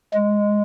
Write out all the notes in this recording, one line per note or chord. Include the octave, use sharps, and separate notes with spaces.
G#3